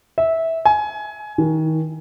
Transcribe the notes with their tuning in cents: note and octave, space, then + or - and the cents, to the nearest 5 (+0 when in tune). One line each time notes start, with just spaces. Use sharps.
E5 -15
G#5 +20
D#3 +30